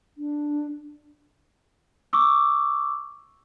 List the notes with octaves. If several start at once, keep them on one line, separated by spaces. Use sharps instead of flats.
D4
C#6 D6 E6